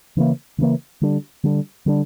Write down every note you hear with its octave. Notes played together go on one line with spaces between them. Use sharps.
C#3 E3 A#3
C#3 E3 A#3
D3 G3 D4
D3 G3 D4
D3 G3 D4